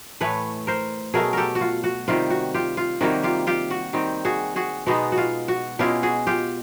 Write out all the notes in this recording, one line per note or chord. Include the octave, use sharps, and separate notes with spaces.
A2 E3 A3 B4 C#5
A#4 C5
B2 F#3 A3 G#4 A#4
G4 A4 A#4
F#4
F4
F#4
C3 D#3 G3 F4
F#4
F4 G4
F4
C3 D#3 G3 A#3 F#4
F4 G4
F4 G4
F#4
D#3 G3 C4
F#4 G#4
F#4 G#4
B2 G#3 B3 D#4 F#4
F#4
F4
F#4
B2 G#3 C#4 E4 F4 G4
F#4 G#4
F4 G4